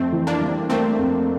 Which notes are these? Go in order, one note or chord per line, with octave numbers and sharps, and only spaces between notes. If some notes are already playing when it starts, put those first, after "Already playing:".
Already playing: F2 A3 C4
E3
A#3 D4
G3
A3 A#3 C4
F2